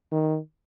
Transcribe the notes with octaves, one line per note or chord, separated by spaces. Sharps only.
D#3